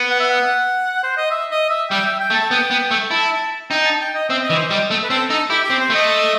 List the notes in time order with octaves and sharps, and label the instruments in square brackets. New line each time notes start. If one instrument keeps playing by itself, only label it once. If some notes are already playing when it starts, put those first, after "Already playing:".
Already playing: [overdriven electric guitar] B3
[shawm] F#5
E5
F#5
C5
D#5
E5
D#5
E5
[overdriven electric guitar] G3 [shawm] G5
[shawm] E5
G5
[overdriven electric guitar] A3
[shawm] A5
[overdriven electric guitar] B3 [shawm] G5
[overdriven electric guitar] B3
A3
[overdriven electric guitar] E4 [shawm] A5
[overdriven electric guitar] D#4 [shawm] G5
[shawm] A5
G5
D#5
[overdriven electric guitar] C4 [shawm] E5
[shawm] D#5
[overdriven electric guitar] E3
[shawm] C5
[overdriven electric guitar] G3 [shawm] D#5
[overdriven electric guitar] A3
[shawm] B4
[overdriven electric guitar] C4 [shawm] A4
[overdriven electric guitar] D#4 [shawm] A4
[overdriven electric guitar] E4 [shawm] G4
[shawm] G4
[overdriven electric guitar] C4
[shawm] C5
[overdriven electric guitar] A3 [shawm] D#5